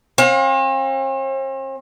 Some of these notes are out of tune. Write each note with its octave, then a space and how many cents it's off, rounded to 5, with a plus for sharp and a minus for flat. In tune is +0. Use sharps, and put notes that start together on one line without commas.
C4 +45 F5 +35